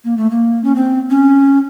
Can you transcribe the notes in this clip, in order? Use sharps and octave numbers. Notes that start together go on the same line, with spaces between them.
A#3
A3
A#3
C#4
C4
C#4